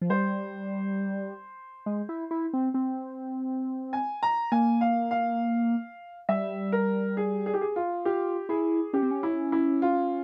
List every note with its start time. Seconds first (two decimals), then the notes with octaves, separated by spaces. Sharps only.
0.01 F3
0.10 G3 C5
1.86 G#3
2.09 E4
2.31 E4
2.53 C4
2.74 C4
3.93 G#5
4.23 A#5
4.52 A#3 G#5
4.81 F5
5.11 F5
6.29 G3 E5
6.72 A#4
7.17 G#4
7.46 G#4
7.54 G4
7.61 G#4
7.76 F4
8.05 F4 G4
8.49 E4 G#4
8.93 C#4 G4
9.03 C4
9.11 C#4
9.23 E4
9.52 E4
9.82 F4